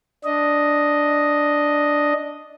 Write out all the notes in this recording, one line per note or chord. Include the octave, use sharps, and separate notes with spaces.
D4 D#5